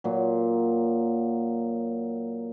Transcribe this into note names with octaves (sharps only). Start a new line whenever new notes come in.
A#2 F#3